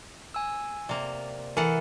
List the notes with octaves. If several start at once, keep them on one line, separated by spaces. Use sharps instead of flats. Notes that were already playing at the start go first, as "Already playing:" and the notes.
G#5 E6
C3 A#3 D5
E3 A4 A#4 F#5